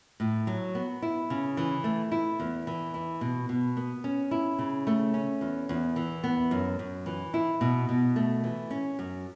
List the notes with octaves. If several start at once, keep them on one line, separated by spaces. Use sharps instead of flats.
A2
F#3
B3
E4
C#3
E3
A3
E4
E2
E3
E4
B2
B2
B3
C#4
E4
C#3
A3
C#4
E2
E2
E3
B3
F#2
F#2
E3
E4
B2
B2
A3
E3
C#4
F#2